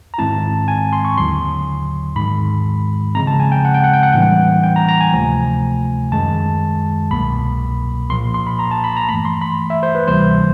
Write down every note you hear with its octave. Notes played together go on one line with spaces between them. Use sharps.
A#5
G#2 D#3 G#3 C4 E4 A5
G#5
C6
C#6
D#2 D3 F#3 C6
G#2 D#3 G#3 B5
C#3 F3 G#3 C4 A#5
A5
G#5
G5
F#5
G5
F#5
G5
F#5
A2 E3 G3 A#3 D4 G5
F#5
G5
A#5
A#5
G#5
D2 C3 F3 A3
F#2 D#3 G#3 A5
C2 B2 F#3 A#3 B5
A#2 F3 A#3 C6
C6
B5
A#5
A5
B5
A#5
G2 E3 A3 B5
C6
B5
E5
C5
B4
D2 C3 E3 G3 A#3 C5